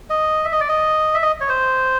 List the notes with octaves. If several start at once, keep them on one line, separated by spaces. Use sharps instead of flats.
D#5
E5
D#5
D5
D#5
E5
D#5
C#5
C5